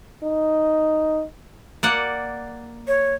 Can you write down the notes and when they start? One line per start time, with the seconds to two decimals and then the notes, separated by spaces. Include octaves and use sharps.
0.23 D#4
1.83 A#3 D5 F#5
2.88 C#5